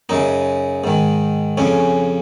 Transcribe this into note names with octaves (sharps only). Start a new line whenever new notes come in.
F#2 C#3 D#4
G#2 D#3
F2 C#3 C#4